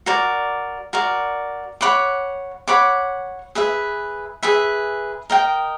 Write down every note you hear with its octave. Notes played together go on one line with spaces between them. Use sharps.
F#4 A#4 D5
F#4 A#4 D5
C#5 F#5 B5 D6
C#5 F#5 B5 D6
G#4 B4 E5
G#4 B4 E5
A#4 D#5 G5